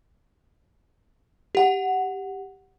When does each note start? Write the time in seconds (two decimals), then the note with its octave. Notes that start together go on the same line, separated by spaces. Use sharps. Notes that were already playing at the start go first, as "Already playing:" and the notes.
1.55 G4 F#5